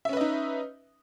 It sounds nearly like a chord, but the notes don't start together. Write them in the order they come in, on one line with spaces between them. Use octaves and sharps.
E5 C#4 B4 D#5 D#4